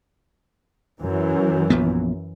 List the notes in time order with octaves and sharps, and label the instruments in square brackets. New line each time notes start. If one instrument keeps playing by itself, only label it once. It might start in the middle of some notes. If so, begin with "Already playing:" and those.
[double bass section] F#2 E3
[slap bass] A#1 F3 B3